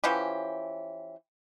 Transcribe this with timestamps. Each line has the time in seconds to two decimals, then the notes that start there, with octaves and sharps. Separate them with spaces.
0.04 E3 F3 C#4 G4